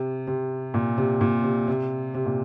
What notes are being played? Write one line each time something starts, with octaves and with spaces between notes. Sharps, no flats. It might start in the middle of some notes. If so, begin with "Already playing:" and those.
Already playing: C3
C3
A#2
C3
A#2
C3
C3
C3
A#2